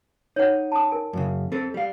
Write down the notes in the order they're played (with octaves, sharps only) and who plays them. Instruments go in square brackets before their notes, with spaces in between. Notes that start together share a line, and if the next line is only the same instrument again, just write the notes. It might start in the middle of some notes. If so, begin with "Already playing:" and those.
[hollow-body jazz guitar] D#4 [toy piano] C#5 F#5
[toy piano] A5 D#6
A#4 G#5
[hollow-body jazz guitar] F#2 C#3
C4 A4
G3 F5